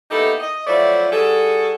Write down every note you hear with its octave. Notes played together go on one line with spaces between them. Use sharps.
A#3 B3 D#4 E4 G4 A4
D#5
F3 F#3 A3 E4 C5 D5
G3 F#4 G#4 A4